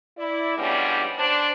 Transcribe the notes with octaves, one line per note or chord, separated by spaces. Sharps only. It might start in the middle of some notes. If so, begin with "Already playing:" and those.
E4 D5
G#2 F3 G3 B3 C#4 D4
D4 C5